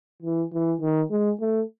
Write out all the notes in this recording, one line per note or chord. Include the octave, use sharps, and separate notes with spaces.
E3
E3
D#3
G#3
A3